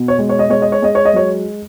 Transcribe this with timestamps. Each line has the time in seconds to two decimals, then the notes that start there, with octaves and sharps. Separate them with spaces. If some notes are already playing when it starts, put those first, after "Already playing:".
Already playing: B2
0.08 C#5
0.19 G#3
0.29 C#5
0.39 D#5
0.50 G#3 C#5
0.62 D#5
0.72 C#5
0.82 G#3 D#5
0.95 C#5
1.05 D#5
1.13 F#3 C#5